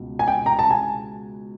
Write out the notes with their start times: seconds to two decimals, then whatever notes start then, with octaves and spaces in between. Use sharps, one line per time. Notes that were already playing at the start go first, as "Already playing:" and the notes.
Already playing: C#2 B2
0.19 G#5
0.28 G5
0.46 A#5
0.59 A5
0.71 G#5